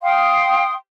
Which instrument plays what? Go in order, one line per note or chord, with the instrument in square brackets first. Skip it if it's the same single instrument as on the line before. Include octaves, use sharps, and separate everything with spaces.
[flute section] F5 G5 C6 D#6